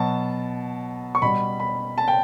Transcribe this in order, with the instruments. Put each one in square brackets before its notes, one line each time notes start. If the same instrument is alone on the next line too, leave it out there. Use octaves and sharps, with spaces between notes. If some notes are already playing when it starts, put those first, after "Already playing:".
Already playing: [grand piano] B2 F#3 A5
C#6
B2 G3 B5
B5
A5
G5